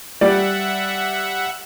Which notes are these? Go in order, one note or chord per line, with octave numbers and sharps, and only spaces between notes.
G3 D5 E5 F#5